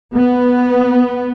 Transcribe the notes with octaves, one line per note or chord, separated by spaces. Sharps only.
B3